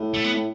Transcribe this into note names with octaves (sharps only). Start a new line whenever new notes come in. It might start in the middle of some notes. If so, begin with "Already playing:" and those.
Already playing: A2
A3
B3
A2